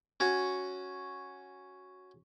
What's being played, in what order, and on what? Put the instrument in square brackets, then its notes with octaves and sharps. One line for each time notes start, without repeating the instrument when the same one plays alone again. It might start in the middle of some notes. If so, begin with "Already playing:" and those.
[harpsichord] C#4 F#4 C#5